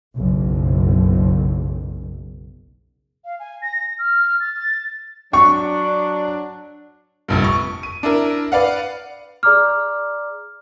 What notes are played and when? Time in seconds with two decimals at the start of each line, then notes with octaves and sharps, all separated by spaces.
0.16 F#1 B1 F#2
3.25 F5
3.39 G#5
3.62 A#6
3.76 A#6
3.99 F6
4.40 A6
5.33 F#3 D4 C#6
7.28 F1 A#1 G2
7.44 C#6
7.83 D#7
8.03 D4 E4 A#4
8.52 B4 D5 F5 F#5
9.43 G#4 D5 A#5 D6 F6